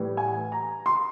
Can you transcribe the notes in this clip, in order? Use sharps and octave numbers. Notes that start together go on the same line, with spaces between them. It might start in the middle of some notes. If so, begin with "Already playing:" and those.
Already playing: A2 E3 G3
G#5
A#5
C6